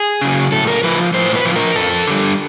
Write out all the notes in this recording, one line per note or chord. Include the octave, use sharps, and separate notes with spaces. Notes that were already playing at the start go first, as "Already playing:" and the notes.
Already playing: G#4
C#3 F#3
A2 A4
A#4
F3 B4
A2 C5
B4
F3
A#4
F2 A4
D3 G3